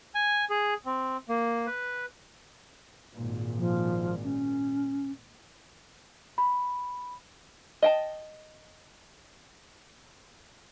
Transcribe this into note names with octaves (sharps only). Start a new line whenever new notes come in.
G#5
G#4
C4
A#3
B4
G#1 A#2
F3
C#4
B5
D#5 G5 A5